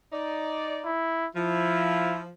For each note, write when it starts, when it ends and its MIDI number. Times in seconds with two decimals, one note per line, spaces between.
0.13 0.91 63
0.13 0.91 74
0.85 1.27 64
1.35 2.29 53
1.35 2.22 64